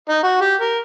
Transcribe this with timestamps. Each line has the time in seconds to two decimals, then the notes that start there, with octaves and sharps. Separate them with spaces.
0.10 D#4
0.23 F#4
0.41 G4
0.61 A#4